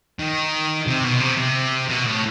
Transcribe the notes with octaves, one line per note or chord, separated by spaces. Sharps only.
D#3
C3
B2
C3
C3
B2
A2